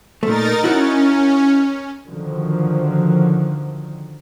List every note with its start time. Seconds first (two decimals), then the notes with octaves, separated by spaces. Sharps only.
0.23 A#2 A3 D#4 A#4 A6
0.64 C#4 E4 F#4 C#5
2.08 D3 D#3 F3 F#3